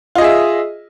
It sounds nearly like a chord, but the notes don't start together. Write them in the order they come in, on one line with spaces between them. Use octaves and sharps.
F4 D#5 G#4 E5